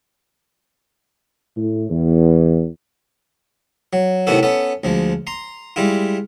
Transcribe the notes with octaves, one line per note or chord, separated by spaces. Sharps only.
A2
E2
F#3
A2 C3 D#3 B3 F#4 A4
B3 C#4 A4
D2 F3 G#3
A#5 C6
G3 G#3 E4 F4